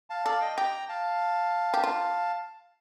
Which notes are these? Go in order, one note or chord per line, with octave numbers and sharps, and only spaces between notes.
F5 A5
A4 D5 F5
D#5 G5
G4 G5 A#5
F5 A5
G4
F4